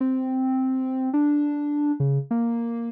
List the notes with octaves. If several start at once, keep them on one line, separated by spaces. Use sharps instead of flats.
C4
D4
C#3
A#3